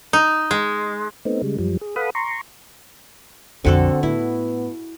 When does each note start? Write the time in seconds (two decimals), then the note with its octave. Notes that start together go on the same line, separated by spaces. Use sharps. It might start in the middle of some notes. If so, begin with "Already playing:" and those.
0.13 D#4
0.51 G#3
1.25 A3 B3 C4 D#4
1.42 C#3 G3 G#3
1.58 F#2 F3 G3
1.81 G#4
1.96 A4 B4 F5 F#5 B5 D#6
2.15 A#5 C6 C#6
3.65 A#1 F2 D3 C4 F#4 A4
4.03 A2 B3 E4